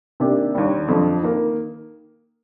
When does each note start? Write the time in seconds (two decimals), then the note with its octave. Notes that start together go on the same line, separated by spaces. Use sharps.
0.20 C3 D#3 A#3 D4 G4
0.55 D#2 D3 G3 D4
0.88 F2 D3 F3
1.23 D#3 A#3